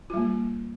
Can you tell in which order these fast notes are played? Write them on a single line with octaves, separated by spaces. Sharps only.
F4 G3 A#3